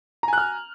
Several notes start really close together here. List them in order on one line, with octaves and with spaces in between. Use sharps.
A#5 G#5 F#6 F6